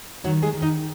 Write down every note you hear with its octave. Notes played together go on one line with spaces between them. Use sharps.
D#3 F#3 F#4
G#3 G#4
D#3
D#4 D#5